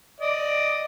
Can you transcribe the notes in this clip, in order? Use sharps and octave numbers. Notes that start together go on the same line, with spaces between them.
D5 D#5